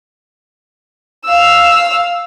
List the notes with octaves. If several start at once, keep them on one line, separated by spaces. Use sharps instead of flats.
F5 E6